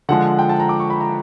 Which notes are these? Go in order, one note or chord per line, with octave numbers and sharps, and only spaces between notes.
D3 F3 G#3 F#5
G5
A5
A#5
D6
C#6
B5
A#5